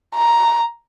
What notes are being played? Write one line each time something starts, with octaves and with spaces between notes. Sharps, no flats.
A#5